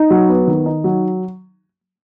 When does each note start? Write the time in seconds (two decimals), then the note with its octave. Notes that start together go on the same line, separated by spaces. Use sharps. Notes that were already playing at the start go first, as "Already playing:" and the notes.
Already playing: D#4
0.10 F#3
0.29 B3
0.48 D#3
0.66 D#4
0.84 F#3